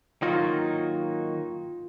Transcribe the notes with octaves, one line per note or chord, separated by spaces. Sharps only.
D#3 F#3 A#3 D#4 F4 F#4